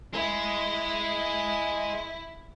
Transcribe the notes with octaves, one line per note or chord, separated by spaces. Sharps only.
G#3 E4